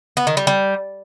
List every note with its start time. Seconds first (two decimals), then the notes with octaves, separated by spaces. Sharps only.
0.17 B3
0.27 D#3
0.37 G3
0.47 G3